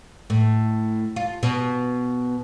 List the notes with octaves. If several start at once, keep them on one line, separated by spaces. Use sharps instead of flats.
A2
F4
B2